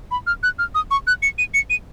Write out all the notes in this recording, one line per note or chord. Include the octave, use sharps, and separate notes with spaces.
B5
F6
F#6
F6
D#6
C#6
F#6
C#7
D#7
C#7
D#7